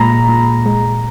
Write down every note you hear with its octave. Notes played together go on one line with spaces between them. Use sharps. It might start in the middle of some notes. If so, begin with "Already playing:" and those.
Already playing: A#2 G#3 A#5 B5
A#2
G#3